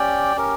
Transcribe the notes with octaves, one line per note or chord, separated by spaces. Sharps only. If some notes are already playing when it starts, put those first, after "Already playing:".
Already playing: C#4 G4 D5 G5
C#4 G4 A#4